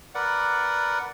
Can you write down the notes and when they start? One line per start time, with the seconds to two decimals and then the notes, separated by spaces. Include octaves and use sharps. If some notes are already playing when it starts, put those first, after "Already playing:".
0.15 A#4 B4 D5 F#5